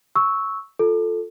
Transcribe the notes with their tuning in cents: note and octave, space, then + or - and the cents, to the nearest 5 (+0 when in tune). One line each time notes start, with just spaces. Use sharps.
C#6 +0 E6 -10
F4 +15 A4 +0